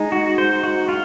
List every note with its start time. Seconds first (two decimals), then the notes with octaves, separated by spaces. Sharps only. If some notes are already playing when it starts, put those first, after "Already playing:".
Already playing: G#3 D#4
0.12 F#4
0.38 C5
0.63 F#4
0.89 F4